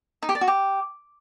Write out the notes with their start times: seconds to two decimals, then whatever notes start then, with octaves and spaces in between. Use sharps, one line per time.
0.23 D#4
0.29 G4
0.35 D5
0.41 F#4
0.48 G4